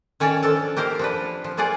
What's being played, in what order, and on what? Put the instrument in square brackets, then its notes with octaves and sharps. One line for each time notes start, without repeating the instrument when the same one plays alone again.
[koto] D#3 C#4 C#5 D5 A5
F3 D4 A4 A5
A#3 G4 A#4 C5 F5
F3 D4 B4
F3
A#3 F4 G#4 D5 F#5